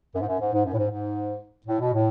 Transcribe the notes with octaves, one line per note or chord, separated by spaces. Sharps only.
F#2
G#2
F#2
G#2
G#2
F#2
A2
G#2
G#2
A2
B2
A2